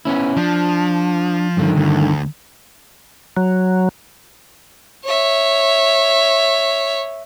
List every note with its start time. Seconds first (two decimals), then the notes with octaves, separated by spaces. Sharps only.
0.05 B3 C#4 E4
0.37 F3 D4
1.57 G2 D3 D#3
1.76 D2
3.37 F#3
5.04 C#5 E5